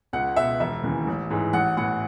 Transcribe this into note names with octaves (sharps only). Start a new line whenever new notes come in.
C#2 F#5
B2 E5
E1 E5
D#2 C#3 E3
A1
G#2 E3
A1 F#5
A2 E3 F#5